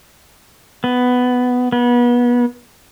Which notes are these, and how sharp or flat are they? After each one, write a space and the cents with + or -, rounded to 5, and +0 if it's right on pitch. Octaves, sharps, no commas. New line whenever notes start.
B3 +10
B3 -30